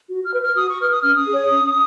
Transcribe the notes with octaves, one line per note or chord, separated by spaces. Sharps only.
F#4
F6
B4
F6
F#4 D#6
C#6
B4 F6
D#6
C#4 F6
D#6
G#4 C#5
C#4